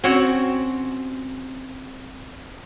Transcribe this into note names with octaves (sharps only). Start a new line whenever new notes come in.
C4 C#4 F#4 C#5 F#5